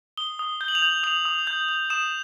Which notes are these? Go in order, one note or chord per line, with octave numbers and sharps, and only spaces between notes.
D#6 G7
D#6
G6 G7
F#7
F7
G6 F#7
D#6 F7
D#6
G6
G6
D#6 E7